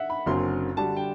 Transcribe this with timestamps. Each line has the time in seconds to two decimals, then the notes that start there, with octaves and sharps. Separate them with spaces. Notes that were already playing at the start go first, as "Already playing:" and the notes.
Already playing: E5 F#5
0.10 B5
0.26 F#1 F#2 D3 F#3 C4 C6
0.77 D3 G3 D4 F#4 A5
0.97 G5